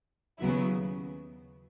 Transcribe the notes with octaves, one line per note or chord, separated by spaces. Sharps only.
D#2 C#3 F#3 B3 E4